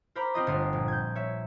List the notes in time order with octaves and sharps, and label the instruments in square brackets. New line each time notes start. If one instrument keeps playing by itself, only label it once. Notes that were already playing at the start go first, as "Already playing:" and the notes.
[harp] A#4 C5 A#5 B5 D6
C4 F4 D#5 D#6
G1 A3 D#6 C7
A#1
G6 G#6
C#5 E5